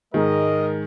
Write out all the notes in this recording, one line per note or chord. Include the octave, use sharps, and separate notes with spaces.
G#2 D#3 G#3 G#4 A#4 D#5